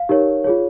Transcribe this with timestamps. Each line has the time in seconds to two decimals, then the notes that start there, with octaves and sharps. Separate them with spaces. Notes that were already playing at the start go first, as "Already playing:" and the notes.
Already playing: F5
0.09 D#4 G4 A#4 C#5
0.44 F4 G#4 C#5